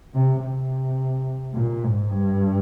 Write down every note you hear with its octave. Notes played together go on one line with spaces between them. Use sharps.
C3
C3
A#2
G#2
G2